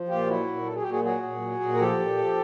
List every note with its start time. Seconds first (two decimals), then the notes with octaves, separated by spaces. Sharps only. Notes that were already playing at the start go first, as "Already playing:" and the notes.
Already playing: F3
0.08 A#2 F4 G4
0.27 F#3 E4 F#4
0.47 A#2
0.66 F#3 A4
0.75 G#4
0.82 A#2 G4
0.90 F#4 G#4
1.04 F#3 F#4 G#4
1.23 A#2
1.41 F#3
1.60 A#2
1.75 A#4
1.79 F3 G4 A4
1.99 A#2
2.18 F3